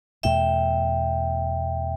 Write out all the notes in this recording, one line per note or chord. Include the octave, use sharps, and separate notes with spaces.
E2 B2 A3 D4 E5 G5